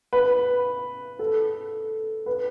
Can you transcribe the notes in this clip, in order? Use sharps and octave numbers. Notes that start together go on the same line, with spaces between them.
B4
A4
B4